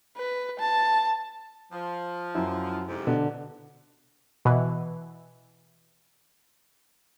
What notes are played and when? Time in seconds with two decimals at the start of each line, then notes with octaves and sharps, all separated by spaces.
0.17 B4
0.59 A5
1.72 F3
2.35 F#2 E4
2.87 F2 G#2 C3
3.07 B2 D3
4.45 B2 E3